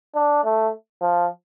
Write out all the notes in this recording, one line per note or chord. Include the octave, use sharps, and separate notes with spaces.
D4
A3
F3